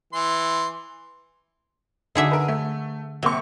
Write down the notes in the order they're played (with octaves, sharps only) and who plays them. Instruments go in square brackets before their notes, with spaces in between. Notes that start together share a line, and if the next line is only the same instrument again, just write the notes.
[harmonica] E3 C6
[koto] D3 G#4 E5 [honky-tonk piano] D#4 F#4
[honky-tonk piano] A#4 B4
A3
[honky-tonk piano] C3 A#3 C#6 [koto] F#3